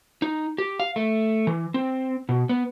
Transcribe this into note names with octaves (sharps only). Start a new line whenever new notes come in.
D#4
G4
F5
A3
E3
C4
B2
B3